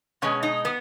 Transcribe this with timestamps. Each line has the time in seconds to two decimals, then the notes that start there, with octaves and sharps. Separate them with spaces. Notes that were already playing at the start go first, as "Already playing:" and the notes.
0.22 B2 G#3 C#4
0.43 D#4
0.65 B3